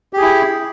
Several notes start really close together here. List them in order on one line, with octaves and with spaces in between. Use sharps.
G4 G#4 E4